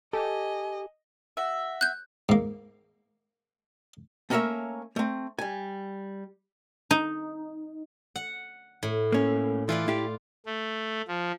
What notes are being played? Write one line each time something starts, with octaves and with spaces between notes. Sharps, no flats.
G4 A4 D#5 G#5
F#4 E5
F#6 G6
G#2 A#3
A3 A#3 C#4 A#4 C#5 E5
A3 C4
G3 G#5
D#4
F#5
A2
A#3 C#4
E3 F4 B4 D5
E4 G4 F5
A3
F3